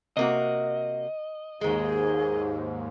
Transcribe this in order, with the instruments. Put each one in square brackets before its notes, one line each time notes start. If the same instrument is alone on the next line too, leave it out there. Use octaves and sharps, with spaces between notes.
[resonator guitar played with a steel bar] C3 A#3 F#4 [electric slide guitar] D#5
[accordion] D#2 G#2 [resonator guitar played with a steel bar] D#3 G#3 [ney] G#4